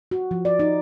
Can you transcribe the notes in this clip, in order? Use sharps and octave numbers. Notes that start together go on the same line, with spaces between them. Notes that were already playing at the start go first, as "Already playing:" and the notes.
F#4
F3
D5
D#4